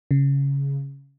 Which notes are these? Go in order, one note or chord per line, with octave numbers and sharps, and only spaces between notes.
C#3